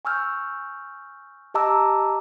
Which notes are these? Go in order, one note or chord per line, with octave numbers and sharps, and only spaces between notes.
G#5 C#6 E6 F6 G6
G4 D#5 A5 A#5 D6 E6